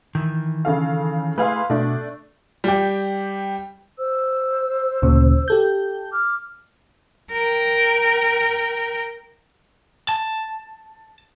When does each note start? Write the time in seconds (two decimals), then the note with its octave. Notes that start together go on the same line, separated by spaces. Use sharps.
0.15 D#3 E3
0.65 C#3 A4 F5
1.38 A3 E4 G#4 B4 F5 C6
1.70 B2 A3 D4
2.64 G3 G4
3.99 C5 E6
5.02 D2 A#2 C#3
5.48 G4 A4 G6
6.12 D6 F6
7.32 A#4 G5
10.09 A5